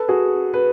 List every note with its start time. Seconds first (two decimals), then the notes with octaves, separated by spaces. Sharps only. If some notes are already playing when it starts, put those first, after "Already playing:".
Already playing: A4 B4
0.08 F#4 G#4
0.54 B4